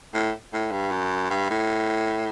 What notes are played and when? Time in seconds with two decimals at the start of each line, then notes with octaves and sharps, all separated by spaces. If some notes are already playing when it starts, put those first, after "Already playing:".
0.14 A2
0.53 A2
0.72 G2
0.91 F#2
1.30 G2
1.50 A2